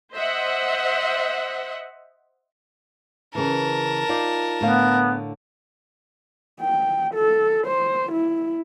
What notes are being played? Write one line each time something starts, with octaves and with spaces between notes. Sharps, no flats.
C5 D#5 E5 F#5
C#3 E3 A#4 A5
D#4 F4 D5
A2 D3 B3 F5
G5
A4
C5
E4